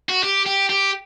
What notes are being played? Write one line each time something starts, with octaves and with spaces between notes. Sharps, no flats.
F#4
G4
G4
G4